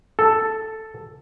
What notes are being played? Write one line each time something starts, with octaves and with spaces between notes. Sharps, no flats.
A4